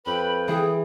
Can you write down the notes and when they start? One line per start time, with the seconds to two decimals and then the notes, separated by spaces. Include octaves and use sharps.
0.06 F2 B4 G5 B5
0.48 E3 G#4